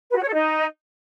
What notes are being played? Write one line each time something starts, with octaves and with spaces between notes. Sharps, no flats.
B4
F#4
C#5
A4
D#4